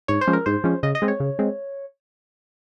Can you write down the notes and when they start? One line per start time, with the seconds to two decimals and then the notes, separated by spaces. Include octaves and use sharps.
0.08 G#2 C#5
0.21 C5
0.27 F3 G#3 C#4
0.33 A#4
0.46 G#2 C5
0.64 F3 G#3 C#4
0.83 C#3 D#5
0.95 D#5
1.02 G#3 C4
1.08 C#5
1.20 C#3
1.39 G#3 C4